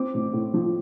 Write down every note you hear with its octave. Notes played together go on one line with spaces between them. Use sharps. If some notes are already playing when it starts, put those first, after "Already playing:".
Already playing: C4 D6
A1
A2
F3